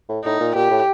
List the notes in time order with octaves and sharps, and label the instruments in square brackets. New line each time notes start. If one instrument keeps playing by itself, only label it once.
[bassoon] A2
[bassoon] A2 [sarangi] D#4
[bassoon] A#2
[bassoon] A#2 [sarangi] G4
[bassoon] A2